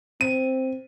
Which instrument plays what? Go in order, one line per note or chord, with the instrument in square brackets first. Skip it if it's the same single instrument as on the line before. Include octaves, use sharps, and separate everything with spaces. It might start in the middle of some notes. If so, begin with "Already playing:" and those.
[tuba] C4 [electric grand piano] D#7